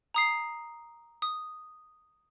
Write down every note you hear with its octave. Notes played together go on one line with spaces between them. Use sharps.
A#5 D#6 C7
D#6